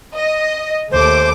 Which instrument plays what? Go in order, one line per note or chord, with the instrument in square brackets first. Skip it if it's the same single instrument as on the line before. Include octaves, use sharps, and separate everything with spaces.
[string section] D#5
[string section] D#2 A3 D6 [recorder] C5